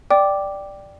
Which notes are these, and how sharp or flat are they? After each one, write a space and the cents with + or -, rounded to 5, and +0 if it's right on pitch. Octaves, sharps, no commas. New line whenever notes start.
D5 +0 G5 +0 D6 +0